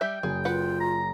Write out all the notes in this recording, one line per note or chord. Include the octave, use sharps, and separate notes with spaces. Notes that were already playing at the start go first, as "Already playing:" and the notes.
G3 G4 E5 G5
F#1 G#4
F4 B4 F#5
A#5